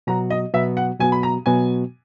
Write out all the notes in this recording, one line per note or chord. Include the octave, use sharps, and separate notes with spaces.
B2 F#3 B3 F#4 A#5
D#5
B2 F#3 B3 F#4 E5
F#5
B2 F#3 B3 F#4 G#5
B5
A#5
B2 F#3 B3 F#4 G#5